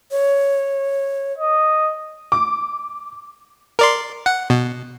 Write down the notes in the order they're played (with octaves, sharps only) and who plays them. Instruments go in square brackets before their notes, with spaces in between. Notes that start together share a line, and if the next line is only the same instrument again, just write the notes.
[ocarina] C#5
[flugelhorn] D#5
[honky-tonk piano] D6
[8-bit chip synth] A#4 D5 C6
F#5
B2